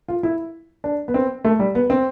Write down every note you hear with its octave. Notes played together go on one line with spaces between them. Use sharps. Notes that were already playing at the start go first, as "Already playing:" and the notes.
F4
E4
D4
B3
C4
A3
G3
B3
C4